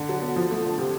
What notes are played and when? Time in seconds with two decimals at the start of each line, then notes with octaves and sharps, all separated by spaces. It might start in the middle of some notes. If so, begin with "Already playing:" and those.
Already playing: D3
0.09 F#3
0.22 B3
0.36 F3
0.51 A3
0.65 D3
0.78 C3